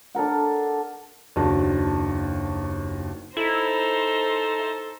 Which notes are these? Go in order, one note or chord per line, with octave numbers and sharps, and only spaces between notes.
D4 A4 A#4 F#5
F#1 D#2 D4 F#4 A5
D#4 E4 A4 C5